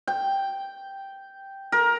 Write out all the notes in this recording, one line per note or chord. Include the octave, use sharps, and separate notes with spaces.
G5
A#4